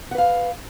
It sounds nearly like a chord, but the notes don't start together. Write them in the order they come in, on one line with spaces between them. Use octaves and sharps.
F#5 B4 F5